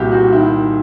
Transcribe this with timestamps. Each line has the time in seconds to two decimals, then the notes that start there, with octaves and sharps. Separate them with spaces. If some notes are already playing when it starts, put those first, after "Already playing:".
Already playing: C2 A#2 E4 F#4 G4
0.11 F#4
0.32 D#3 E4